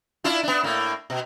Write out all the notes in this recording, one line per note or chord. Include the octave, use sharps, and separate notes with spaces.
D4 E4 F4
B3 D4
A2 A#3
B2